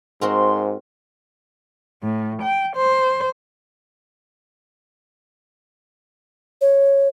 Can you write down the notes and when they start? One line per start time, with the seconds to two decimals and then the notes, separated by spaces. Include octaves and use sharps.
0.21 G#2 C4 F#4 A#4 C6
2.03 A2
2.43 G5
2.76 C5
6.61 C#5